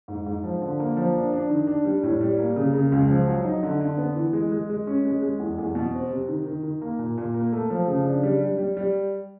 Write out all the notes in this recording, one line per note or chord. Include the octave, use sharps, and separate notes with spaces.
G#2
G#2
F3
D3
A#3
F3
D4
D4
D#3
D4
G3
A2
G3
A#3
C#3
C#3
C#2
F3
F#3
D#4
D3
D3
B3
E3
G#3
G#3
G#3
C#4
G#3
G#3
E2
E2
B2
C4
C3
D#3
D#3
D#3
A#3
A#2
A#2
A#3
A3
F3
C#3
D4
G3
G3
G3
G3